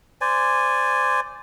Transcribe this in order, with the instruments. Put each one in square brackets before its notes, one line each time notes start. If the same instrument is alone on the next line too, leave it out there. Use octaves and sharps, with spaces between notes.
[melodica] C5 D5 G#5